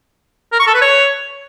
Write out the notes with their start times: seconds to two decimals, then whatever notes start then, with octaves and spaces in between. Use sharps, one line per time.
0.52 A#4
0.59 C#6
0.67 A4
0.74 B4
0.81 C#5